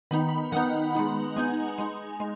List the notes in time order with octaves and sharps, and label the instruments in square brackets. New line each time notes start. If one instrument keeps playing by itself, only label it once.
[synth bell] D#3 B3 D#4 B5
B5
D#3 B3 D#4 F#5
G#3 B3 D#4
G#3 B3 D#4 G#5
G#3 D#4
G#3